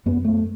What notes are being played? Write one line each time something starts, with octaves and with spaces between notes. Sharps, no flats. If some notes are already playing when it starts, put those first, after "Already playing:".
F#2 B3
A3